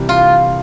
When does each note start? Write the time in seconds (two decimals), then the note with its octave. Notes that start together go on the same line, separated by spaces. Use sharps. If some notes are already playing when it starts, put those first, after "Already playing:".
Already playing: C2 C3 E3 G3
0.09 F4